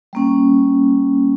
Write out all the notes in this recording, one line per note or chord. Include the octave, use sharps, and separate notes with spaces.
G3 A#3 C#4